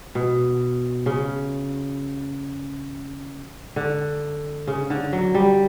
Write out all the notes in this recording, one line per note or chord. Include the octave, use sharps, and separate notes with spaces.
B2
C#3
D3
C#3
D3
F#3
G3